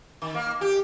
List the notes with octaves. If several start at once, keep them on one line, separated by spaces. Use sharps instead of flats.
D#3
A#3
G4